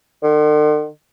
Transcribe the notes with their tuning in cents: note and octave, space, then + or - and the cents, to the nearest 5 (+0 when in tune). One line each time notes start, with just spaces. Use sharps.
D3 +45